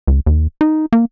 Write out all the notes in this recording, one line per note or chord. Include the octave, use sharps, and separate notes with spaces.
C#2
D#2
D#4
A#3